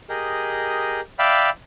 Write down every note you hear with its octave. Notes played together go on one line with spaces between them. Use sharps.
G4 G#4 A#4 D#5
D5 E5 F5 G5 B5